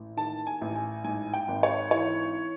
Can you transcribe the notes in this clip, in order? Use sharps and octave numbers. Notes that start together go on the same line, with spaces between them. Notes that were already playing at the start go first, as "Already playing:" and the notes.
Already playing: A1
D#3 A5
G#5
A1
G#5
G#2 G#5
G5
G#1
C#5
E3 C#5